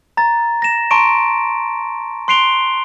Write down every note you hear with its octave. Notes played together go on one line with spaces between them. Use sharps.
A#5 A6
A#6 E7
A5 A#5 C6 C#6 D7
C6 F#6 C7 D7 F7 G7